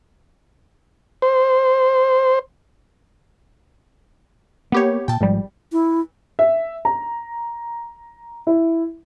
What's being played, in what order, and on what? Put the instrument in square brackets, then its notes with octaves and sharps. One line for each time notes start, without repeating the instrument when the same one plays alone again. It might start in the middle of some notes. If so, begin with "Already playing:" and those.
[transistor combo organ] C5
[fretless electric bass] A#3 [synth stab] B3 G4 C#5
[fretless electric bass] A#2 [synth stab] G5 A5
[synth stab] G#1 G3 [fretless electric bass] G#2 F3
[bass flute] E4
[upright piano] E5
A#5
E4